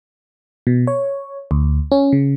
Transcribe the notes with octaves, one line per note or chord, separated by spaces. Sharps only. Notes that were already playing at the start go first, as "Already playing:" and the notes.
B2
C#5
D2
C#4
C#3